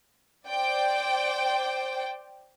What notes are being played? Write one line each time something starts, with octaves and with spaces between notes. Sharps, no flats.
C5 D5 G5